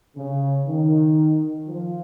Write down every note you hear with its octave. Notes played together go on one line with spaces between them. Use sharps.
C#3
D#3
F3